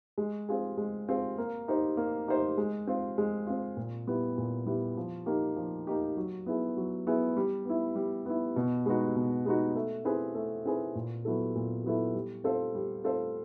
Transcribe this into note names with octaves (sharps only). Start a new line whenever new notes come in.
G#3
C4 F4 G#4
G#3
C4 F4 G#4
A#3
D#4 G4 C5
A#3
D#4 G4 C5
G#3
C4 F4
G#3
C4 F4
A#2
G3 B3 E4
A#2
G3 B3 E4
F3
A#3 D#4 G4
F3
A#3 D#4 G4
F#3
B3 E4 G#4
F#3
B3 E4 G#4
G3
B3 E4
G3
B3 E4
B2
G#3 B3 D#4 F#4
B2
G#3 B3 D#4 F#4
A3
C4 E4 G#4 B4
A3
C4 E4 G#4 B4
A#2
F#3 B3 E4 A4
A#2
F#3 B3 E4 A4
G3
C4 F4 A4 C5
G3
C4 F4 A4 C5